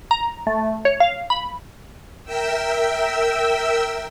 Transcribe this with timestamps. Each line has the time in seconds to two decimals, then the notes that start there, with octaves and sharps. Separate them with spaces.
0.11 A#5
0.47 A3
0.85 C#5
1.00 F5
1.30 B5
2.24 A#4 E5 G5 E6